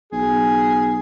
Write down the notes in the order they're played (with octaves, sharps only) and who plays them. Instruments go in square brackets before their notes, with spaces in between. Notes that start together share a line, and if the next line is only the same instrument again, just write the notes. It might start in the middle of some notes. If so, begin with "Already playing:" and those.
[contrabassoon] B1 [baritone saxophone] G#4